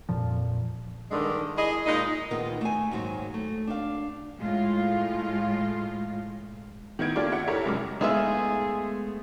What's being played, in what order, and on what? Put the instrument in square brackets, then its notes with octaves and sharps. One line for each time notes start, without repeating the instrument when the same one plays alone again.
[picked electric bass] F2 A#2 F3
[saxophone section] G2 D3 D#3 G#3
E4 G#4 D#5
A#2 G#3 D#4
[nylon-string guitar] D2 A#2 D#3 B3 F4 B4
A3 G#5
D#2 G#2 D#3 F#3 C5
A3
D4 F5
[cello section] A2 G#3 F4
[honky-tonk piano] D#3 B3 E4 G#6 D7
A3 A#3 D4 F4 G4 D5
E5 F#5
E4 G4 A4 A#4 C#5 E5
F1 F#2 G#3 D6
[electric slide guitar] G#3 A3 B3 [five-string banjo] D#4 F4 E5 [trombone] G#4